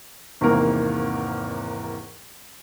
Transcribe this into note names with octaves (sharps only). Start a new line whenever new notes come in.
G#1 E2 G#2 C3 A#3 A#4